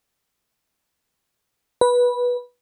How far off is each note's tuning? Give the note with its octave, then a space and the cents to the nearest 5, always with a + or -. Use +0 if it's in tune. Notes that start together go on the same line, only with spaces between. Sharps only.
B4 -15